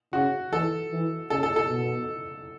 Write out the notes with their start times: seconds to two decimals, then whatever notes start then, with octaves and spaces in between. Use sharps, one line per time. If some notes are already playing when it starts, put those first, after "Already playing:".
0.13 C#3 F#4
0.52 E3 A4
0.91 E3
1.30 C#3 A4
1.43 A4
1.56 A4
1.69 B2